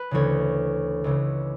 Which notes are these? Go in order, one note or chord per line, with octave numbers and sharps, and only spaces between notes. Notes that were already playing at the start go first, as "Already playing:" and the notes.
Already playing: B4
D2 C#3 E3 C#5
C#2 C#3 E3